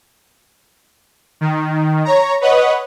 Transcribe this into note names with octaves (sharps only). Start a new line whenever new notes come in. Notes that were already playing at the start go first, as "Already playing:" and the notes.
D#3
C#5 A#5
B4 C#5 D#5 F#5